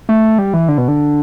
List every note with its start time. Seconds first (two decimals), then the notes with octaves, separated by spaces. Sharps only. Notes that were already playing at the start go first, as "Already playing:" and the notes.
0.09 A3
0.38 G3
0.54 E3
0.68 D3
0.78 B2
0.88 D3